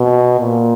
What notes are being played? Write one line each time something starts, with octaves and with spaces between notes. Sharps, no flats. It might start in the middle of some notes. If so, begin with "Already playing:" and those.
Already playing: B2
A#2